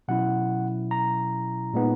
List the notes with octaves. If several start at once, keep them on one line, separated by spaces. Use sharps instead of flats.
B2 F#3 C#4 E4 F#5
A#5
A#2 G#3 B3 D#4